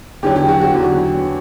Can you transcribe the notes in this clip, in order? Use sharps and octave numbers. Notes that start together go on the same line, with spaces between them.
E2 D3 F#3 G4
G4
F#4
F#4
E2 D3 F#3